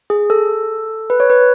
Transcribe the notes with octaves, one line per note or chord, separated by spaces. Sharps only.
G#4
A4
B4
C#5
B4